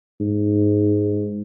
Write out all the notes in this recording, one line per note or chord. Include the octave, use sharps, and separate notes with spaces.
G#2